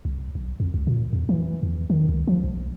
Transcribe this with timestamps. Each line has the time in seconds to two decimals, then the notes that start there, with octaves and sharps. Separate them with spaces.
0.05 C2
0.35 B1
0.60 F2
0.74 C#2
0.87 A#2
1.13 E2
1.29 E3
1.63 E2
1.90 D#3
2.09 C#2
2.27 F3
2.44 B1